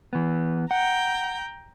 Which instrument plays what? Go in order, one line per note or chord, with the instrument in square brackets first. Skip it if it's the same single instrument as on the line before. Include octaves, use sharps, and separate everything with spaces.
[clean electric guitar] E3 B3
[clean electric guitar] F#5 [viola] G5 A#5